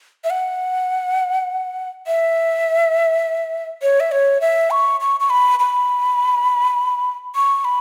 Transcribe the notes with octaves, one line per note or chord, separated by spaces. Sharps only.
E5
F#5
E5
C#5
E5
C#5
E5
C#6
C#6
C#6
B5
B5
C#6
B5